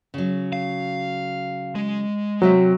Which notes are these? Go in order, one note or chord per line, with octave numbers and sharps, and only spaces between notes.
C#3 F#3
F5
G#3
C3 F#3 C4 E5